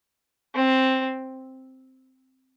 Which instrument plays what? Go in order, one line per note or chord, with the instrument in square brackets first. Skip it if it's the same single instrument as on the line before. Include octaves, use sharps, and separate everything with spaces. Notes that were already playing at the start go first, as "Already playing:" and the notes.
[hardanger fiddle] C4